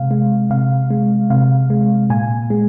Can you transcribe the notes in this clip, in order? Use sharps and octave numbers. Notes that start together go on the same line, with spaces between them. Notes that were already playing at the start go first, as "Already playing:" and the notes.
Already playing: C3 G#3 F5
G#3
C3 F5
G#3
C3 F5
G#3
A#2 G#5
G#3